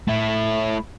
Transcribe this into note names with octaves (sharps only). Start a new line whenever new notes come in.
A3 E4